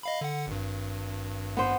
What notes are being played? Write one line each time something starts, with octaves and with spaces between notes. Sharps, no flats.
D#5 F5 B5
D3 F#5
G#1 G2
B3 C5